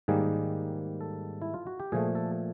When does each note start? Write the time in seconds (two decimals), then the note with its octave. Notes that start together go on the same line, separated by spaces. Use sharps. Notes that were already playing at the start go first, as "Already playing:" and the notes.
0.08 G#2 D#3 G3 A#3 G#4
1.01 A4
1.42 E4
1.54 F4
1.67 F#4
1.80 G4
1.92 A#2 F3 A3 G#4
2.15 A4